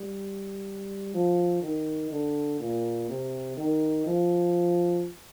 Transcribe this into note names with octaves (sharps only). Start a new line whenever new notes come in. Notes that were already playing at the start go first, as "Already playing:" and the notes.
Already playing: G3
F3
D#3
D3
A#2
C3
D#3
F3